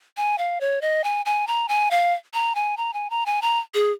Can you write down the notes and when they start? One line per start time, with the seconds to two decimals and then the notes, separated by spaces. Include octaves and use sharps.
0.17 G#5
0.38 F5
0.61 C#5
0.81 D#5
1.04 G#5
1.26 G#5
1.47 A#5
1.68 G#5
1.91 F5
2.34 A#5
2.55 G#5
2.77 A#5
2.94 G#5
3.10 A#5
3.26 G#5
3.42 A#5
3.74 G#4